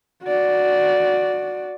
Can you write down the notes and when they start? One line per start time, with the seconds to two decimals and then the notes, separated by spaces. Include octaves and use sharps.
0.24 F#4 D5